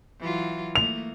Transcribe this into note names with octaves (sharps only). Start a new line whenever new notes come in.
E3 F#3 F4
A3 A#3 F7